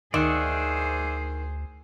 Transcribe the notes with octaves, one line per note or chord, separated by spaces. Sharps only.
D2 D#3 G#4 C5 D5 E5 F#5